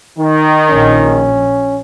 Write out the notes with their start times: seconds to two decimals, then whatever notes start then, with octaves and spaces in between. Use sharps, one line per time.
0.19 D#3
0.69 A#1 C#4